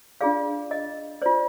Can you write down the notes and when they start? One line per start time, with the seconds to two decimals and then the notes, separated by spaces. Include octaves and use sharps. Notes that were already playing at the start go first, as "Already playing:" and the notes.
0.21 D4 F4 G#4 D5 F5
0.71 D#5
1.22 F4 C5 D5